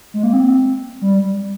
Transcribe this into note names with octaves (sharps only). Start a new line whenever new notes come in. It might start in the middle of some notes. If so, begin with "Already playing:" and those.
G#3
A#3
C4
G3